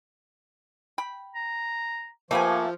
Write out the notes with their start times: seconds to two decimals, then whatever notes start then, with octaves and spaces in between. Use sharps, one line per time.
0.98 G5 B5
1.35 A#5
2.31 F3 A3 A#3 G4 B4 G#5 C#6